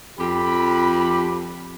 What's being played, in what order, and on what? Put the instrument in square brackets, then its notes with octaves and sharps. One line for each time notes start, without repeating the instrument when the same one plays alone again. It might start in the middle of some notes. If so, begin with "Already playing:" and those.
[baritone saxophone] F2 [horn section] G4 B5